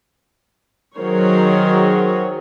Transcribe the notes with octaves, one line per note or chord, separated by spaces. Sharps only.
D#3 F#3 G#4 A#4 C5 C#5